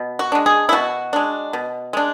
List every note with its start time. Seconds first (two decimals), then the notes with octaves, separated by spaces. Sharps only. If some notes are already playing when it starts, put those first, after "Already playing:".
Already playing: B2
0.19 F#4
0.32 G#3 D4
0.46 G#4
0.69 E4
0.72 B2 F#4
1.13 G#3 D4
1.53 B2
1.93 G#3 D4